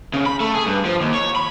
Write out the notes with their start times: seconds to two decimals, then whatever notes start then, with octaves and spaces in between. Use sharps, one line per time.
0.14 C#3
0.26 B5
0.40 A3
0.55 G#4
0.66 G2
0.85 F3
1.01 D#2
1.14 C#5
1.36 B5